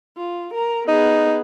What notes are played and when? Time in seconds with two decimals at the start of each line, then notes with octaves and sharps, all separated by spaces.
0.17 F4
0.54 A#4 A#5
0.88 B3 D#4 G#4